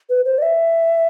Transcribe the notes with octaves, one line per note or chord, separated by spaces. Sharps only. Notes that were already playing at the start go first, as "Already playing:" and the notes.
B4
C5
D5
E5